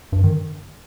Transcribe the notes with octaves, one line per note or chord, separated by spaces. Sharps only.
G2
D#3